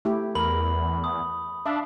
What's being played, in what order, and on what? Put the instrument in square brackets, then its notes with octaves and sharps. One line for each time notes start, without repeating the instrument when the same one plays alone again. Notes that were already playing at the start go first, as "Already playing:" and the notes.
[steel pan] A3 E4 G4
[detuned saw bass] E2 [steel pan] A#4 [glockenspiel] B5 F#7
[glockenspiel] D#6
[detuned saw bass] D4 [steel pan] E5 F5